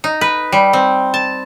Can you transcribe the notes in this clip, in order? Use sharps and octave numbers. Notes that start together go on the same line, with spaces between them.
D#4
B4
G3
C4
A5